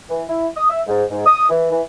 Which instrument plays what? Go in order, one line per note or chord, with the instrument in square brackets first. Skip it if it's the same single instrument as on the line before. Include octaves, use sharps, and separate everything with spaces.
[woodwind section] E3
E4
D#6
E5
G#2
G#2
D#6
E3
E3